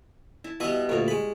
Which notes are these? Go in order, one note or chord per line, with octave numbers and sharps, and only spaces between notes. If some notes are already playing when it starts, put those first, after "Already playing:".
E4 A5
B2 G3 E4 D#5 E5
D2 A#2 A#4 C#5 D5
G#3 B5